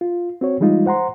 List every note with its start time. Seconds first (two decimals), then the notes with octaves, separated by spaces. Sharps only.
0.01 F4
0.41 C4 F#4 C#5
0.60 E3 G3 G#3 D#4 F4
0.86 C5 F#5 A#5 C6